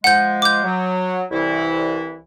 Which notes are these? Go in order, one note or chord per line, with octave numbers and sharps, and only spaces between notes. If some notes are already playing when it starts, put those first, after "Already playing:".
F3 G#3 F#5 G6
D6 G6
F#3
C2 E3 E4